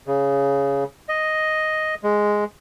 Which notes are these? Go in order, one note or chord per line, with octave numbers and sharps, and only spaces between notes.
C#3
D#5
G#3